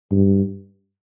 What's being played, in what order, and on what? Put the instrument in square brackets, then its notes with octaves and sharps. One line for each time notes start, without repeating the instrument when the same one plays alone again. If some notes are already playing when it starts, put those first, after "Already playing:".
[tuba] G2